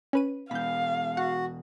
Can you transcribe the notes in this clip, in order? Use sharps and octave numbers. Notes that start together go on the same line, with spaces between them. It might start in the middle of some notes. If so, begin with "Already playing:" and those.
C#4 B4 D#7
E2 B2 F5 B5 G6
F#4 F#5